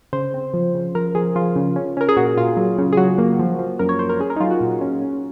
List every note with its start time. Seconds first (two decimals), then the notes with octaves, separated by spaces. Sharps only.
0.13 C#3 C5
0.34 C4
0.54 F3
0.75 C#3
0.95 F3 A#4
1.15 F3 G#4
1.36 F3 F4
1.56 C#3
1.76 C#4
1.97 C#4 A#4
2.09 G#4
2.17 A#2 F#4
2.37 A#2 F4
2.57 F#3
2.78 C#3
2.93 G#4
2.97 F#3 F#4
3.18 A#3
3.39 F3
3.59 F3
3.79 F#2 A#4
3.89 C#5
3.99 F#2 C5
4.09 A#4
4.19 C#4 G#4
4.30 A#4
4.36 D#4
4.40 F#3 F4
4.50 F#4
4.60 A#2
4.81 C#4
5.02 C#4